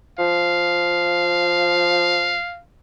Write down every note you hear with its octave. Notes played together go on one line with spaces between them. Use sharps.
F3 F5